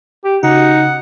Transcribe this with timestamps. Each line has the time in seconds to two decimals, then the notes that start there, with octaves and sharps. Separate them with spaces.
0.24 G4
0.43 C#3 D#4 F#4 F#5